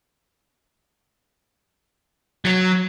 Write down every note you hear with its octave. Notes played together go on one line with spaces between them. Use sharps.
F#3